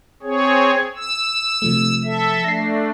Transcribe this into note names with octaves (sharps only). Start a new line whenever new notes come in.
C4 G#4 C#5
E6
C3 F3 A3
A4 E5
A3 D4 A#6 C7